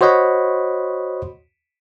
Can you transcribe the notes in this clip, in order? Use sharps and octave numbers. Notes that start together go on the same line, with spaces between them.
F#4 C5 C#5 D#5 F#5 B5